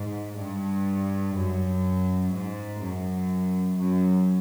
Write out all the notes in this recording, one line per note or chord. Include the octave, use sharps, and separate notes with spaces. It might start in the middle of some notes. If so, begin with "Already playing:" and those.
Already playing: G#2
G2
F#2
G#2
F#2
F#2